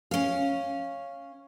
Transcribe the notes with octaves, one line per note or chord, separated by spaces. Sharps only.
C#4 F5